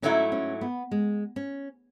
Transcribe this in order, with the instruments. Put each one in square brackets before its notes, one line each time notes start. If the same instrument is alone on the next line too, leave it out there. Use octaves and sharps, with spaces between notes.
[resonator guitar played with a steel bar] G#2 F#3 A3 E4 [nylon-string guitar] C#4
[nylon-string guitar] C#4
B3
G#3
C#4